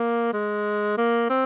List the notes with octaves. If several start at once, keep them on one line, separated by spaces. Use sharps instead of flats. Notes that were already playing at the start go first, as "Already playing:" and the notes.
Already playing: A#3
G#3
A#3
C4